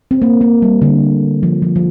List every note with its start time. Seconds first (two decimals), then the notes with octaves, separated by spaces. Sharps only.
0.11 C4
0.22 A#3
0.41 A#3
0.62 G3
0.82 D3
1.43 F3
1.62 F3
1.76 F3